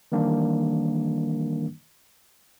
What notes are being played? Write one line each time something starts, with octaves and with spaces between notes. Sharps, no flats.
D#3 E3 G3 A#3 D4